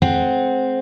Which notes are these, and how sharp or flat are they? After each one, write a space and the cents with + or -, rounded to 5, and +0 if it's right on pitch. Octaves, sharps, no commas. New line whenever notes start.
G#3 +45 C4 +0 F#5 +0